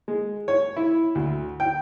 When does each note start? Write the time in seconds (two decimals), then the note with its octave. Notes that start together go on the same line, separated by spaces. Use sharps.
0.08 G#3
0.48 C#5
0.77 E4
1.15 D2
1.60 G5